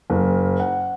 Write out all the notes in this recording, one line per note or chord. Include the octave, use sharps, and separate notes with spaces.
F#1
F#5